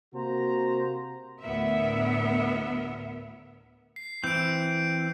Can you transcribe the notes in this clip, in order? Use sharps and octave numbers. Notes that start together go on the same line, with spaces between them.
C3 A#3 F#4 C5 A#5
D2 A2 B3 A#4 E5
C7
E3 C4 G6 D7